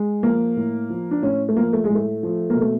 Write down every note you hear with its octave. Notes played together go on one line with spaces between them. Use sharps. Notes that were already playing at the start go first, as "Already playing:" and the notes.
Already playing: G#3
F3 A#3
A2
F3
D4
A2 C#4
A3
F3 A#3
A3
G#3
A2
A3
F3
A#3
B2
A3